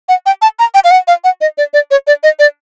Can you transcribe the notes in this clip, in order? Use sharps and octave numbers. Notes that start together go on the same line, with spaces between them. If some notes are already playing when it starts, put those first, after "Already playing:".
F#5
G5
A5
A#5
G5
F5
F#5
F5
F#5
D#5
D5
D5
C#5
D5
D#5
D5